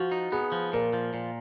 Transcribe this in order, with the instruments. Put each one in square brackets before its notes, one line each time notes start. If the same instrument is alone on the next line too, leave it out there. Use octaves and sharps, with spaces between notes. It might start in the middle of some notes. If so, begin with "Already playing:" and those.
Already playing: [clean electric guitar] F3 [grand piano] F#4
[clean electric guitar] D#4
[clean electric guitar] B3 [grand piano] G#4
[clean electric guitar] F3
[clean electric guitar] A#2 [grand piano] A#4
[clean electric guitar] F3
A#2